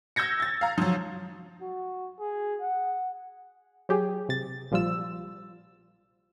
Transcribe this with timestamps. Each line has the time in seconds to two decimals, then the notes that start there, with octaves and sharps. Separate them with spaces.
0.16 E6 G6 G#6 A#6 C#7
0.40 G#6 A6
0.61 F5 A#5
0.78 F3 F#3
1.61 F#4
2.19 G#4
2.61 F#5
3.89 F#3 G4 G#4
4.29 C3 A6
4.71 A#1 F3 G3 F4 E6